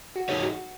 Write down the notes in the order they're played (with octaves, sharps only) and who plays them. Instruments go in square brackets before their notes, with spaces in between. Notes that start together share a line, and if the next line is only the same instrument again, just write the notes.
[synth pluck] F#4
[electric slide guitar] D#4 G#4 C#5
[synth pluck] F#4